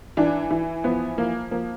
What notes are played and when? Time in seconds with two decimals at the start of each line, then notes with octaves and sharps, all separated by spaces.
0.17 E3 D4
0.50 E3
0.84 F3 B3
1.18 F3 A#3
1.51 F3 A#3